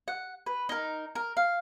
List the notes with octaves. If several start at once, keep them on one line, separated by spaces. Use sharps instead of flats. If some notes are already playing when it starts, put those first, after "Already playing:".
F#5
B4
D#4 A#4
A#4
F5